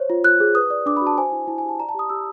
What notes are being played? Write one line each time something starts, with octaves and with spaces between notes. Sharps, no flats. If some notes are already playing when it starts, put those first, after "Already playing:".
Already playing: C5 C#5
F4
F4 F#6
G#4
B4 D#6
D5
D4 D6
B5
F#4 A5
C5 G#5
E4
E4 A5
G#5
G4
A5
D5 A#5
A5
G4 D#6
G4 E6